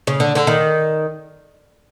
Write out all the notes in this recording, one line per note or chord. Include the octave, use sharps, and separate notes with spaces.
C#3
D3
D3
D#3